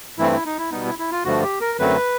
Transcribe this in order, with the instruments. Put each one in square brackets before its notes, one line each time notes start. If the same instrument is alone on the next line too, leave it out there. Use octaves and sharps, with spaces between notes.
[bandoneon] G2 E3 A3 C4 E4
E4
D#4
E4
B2 G3 B3 D#4
E4
E4
F4
G2 D3 F3 A3 F#4
G4
A#4
F#2 D3 F#3 A3 C4 B4